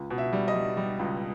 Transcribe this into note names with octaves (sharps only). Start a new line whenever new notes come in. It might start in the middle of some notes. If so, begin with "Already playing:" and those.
Already playing: C#2
B2
E5
G3
D#5
G3
G3
C#2